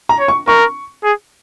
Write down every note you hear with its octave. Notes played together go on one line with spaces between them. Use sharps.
A#5
C#5
C#6
A#4 C#6
G#4